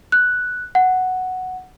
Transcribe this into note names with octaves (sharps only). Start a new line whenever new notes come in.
F#6
F#5